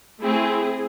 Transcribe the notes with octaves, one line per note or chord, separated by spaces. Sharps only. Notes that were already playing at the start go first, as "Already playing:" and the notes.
A3 C4 E4 G#4